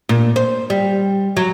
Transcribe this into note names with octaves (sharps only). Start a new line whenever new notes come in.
A#2
C5
G3
F#3